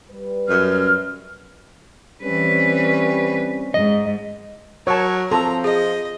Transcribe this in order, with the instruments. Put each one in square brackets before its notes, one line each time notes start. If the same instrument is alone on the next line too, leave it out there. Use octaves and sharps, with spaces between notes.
[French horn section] G3 B4
[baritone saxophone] F#2 [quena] F6
[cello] E3 B4 [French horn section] G3 C4 C#4
[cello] G#2 [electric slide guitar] D#5
[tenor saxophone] F#3 [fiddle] A#4 [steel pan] C#5 A5
[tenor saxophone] F3 [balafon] C4 A5 C6 [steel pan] A4 [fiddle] A#5
[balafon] G#4 [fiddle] D#5